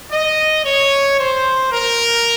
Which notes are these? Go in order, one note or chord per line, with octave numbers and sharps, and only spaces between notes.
D#5
C#5
C5
A#4